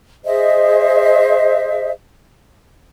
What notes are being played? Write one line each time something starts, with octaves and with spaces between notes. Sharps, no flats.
G#4 C5 D#5 E5